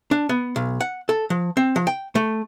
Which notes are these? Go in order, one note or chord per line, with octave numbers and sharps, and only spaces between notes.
D4
B3
B1
F#5
A4
F3
C4
F3
G5
A3